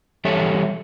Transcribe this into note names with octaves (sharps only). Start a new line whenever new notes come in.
E3 G3 G4 A4 C#5 E5